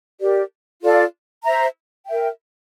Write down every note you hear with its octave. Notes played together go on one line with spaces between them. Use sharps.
G4 A#4 D5
F4 A4 D5 F5
C5 E5 A#5
A#4 E5 G5